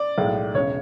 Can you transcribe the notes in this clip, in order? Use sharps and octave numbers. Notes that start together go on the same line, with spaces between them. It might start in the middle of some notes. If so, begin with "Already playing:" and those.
Already playing: D5
B1 A2 G#3
E1 C#3 C#5